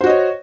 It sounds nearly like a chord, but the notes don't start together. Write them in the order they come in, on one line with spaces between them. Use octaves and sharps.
C5 F#4 D#5 C#5